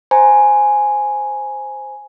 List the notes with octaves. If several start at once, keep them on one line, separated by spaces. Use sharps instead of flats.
C5 G#5 A#5